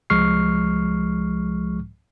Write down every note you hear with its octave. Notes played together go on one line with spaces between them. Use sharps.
C2 F3 G#3 C#6 F6 C7